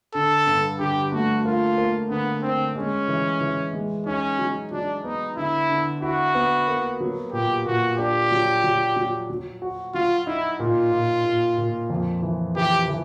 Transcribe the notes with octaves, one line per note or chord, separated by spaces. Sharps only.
D3 A4
G2
D3 G4
A3 F#4
A#3 F4
A#3
D3 B3
D3 C4
G#3 C#4
E3
E3
G#3
C#4 D#4
F#3
F#3 D4
B3 D#4
D3 E4
D3
E4 F#4
B3
A#3
F#3
A#2 G4
A#2 F#4
D4 G4
F#3
F#3
F#3
F#3
F#4
F#3 F4
D#4 E4
A#2 F4
A#2
A#2
A#2
F2
E3
E3 G4
E3